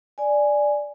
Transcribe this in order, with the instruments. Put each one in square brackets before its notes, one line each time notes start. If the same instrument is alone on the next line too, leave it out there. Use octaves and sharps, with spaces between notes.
[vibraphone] D5 G#5